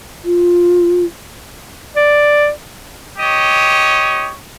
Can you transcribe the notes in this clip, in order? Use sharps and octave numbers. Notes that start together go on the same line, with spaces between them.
F4
D5
G4 C#5 D#5